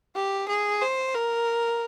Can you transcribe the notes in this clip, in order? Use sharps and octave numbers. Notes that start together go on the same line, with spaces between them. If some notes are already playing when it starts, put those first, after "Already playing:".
G4
G#4
C5
A#4